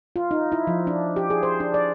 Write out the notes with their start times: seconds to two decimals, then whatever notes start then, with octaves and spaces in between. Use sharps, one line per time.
0.16 F4
0.31 D#4
0.52 E4
0.67 F3
0.87 D4
1.16 G4
1.30 G#4
1.43 C5
1.60 D4
1.74 D5